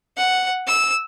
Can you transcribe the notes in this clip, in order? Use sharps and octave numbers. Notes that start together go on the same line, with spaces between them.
F#5
E6